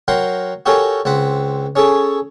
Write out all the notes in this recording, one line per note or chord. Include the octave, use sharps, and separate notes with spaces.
F#3 A#4 F#5 G5 C6
F#4 G4 A4 A#4 C#5 G#5
C#2 C4 F#5 B5
C#4 G#4 A4 C#5